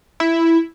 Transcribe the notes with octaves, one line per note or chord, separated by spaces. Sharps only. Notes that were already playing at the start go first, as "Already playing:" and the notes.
E4